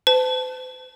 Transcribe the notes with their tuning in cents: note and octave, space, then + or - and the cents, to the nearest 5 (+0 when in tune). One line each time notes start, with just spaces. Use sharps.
C5 -45 A5 +0